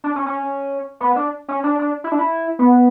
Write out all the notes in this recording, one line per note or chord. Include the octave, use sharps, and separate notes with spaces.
D4
C#4
C#4
B3
D4
C#4
D4
D4
E4
D4
E4
B3